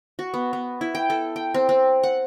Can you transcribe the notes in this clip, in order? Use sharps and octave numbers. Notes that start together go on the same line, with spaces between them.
F#4
B3
B3
E4
G5
A4
G5
C4
C4
F#5